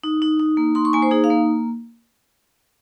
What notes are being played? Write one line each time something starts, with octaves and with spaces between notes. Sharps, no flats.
D#4
D#4
D#4
A#3
D#4 C6
C#6
A#3 G#5
C5
D#4 G#4
F5
A#3